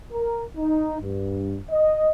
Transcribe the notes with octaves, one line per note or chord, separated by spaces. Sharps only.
A#4
D#4
G2
D#5